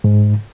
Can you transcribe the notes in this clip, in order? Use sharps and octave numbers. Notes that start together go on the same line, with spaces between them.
G#2